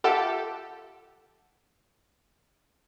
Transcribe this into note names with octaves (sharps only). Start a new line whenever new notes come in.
F4 G4 A4 E5 F#5